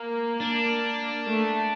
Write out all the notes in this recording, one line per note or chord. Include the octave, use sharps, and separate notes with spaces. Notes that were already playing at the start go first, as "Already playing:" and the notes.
Already playing: A#3
D4
A3